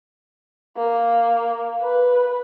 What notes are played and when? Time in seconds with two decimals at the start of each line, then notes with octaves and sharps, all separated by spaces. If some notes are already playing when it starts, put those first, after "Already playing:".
0.77 A#3
1.81 B4